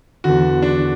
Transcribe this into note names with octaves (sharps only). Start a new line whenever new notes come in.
E2 D3 F#4
D4